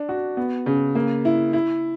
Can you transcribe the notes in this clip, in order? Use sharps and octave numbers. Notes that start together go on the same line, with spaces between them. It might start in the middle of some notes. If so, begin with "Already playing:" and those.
Already playing: D4
F#4
B3
C#3
A#3
E4
E4